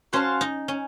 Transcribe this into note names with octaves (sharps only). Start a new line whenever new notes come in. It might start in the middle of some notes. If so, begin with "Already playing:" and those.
C#4 F#4 C5 F5 A5
D#4
C#4